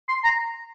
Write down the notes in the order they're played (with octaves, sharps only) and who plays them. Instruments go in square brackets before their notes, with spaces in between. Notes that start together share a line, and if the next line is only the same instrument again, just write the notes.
[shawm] C6
A#5